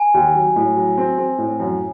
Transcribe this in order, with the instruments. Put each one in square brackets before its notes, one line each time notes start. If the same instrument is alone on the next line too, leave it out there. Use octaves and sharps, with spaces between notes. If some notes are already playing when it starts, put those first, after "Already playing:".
Already playing: [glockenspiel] G#5
[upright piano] D#2
F#3
A2
F#3
C4
C4
A2
F#2